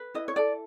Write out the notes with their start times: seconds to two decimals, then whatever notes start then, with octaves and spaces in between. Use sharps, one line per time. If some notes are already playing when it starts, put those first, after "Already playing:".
Already playing: B4
0.14 E4 D#5
0.28 C#5
0.36 A4 D5